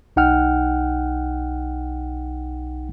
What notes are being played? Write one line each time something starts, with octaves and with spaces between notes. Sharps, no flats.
B1 D#4 F#5 G5 F6